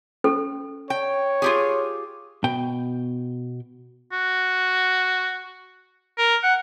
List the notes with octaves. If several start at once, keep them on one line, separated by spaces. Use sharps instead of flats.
C#4 A4
C#5 G5
F4 G4 G#4
B2 G5
F#4
A#4
F#5